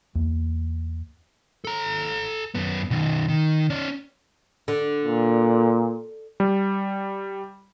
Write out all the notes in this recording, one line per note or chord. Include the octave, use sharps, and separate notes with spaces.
E2 A#3
A4 A#5
F#2 B3
B2 D#3
D#3
C#4 D5
D3
A#2
G3